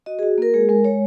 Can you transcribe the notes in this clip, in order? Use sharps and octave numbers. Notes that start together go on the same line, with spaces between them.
F#4 D#5
G#4
F#4
A#3 A#4
G#3 G#4
G#3 A#4
G#3 C#5